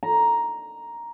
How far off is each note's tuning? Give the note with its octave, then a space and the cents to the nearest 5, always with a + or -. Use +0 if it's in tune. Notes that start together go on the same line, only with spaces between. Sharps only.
A#5 +5